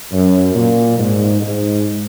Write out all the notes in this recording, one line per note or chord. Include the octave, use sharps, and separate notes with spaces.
F#2
A#2
G#2
G#2